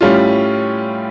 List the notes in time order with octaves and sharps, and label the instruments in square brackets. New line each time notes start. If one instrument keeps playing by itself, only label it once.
[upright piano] A2 G3 C#4 F4